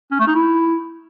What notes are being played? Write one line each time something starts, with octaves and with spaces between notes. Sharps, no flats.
C#4
A3
D#4
E4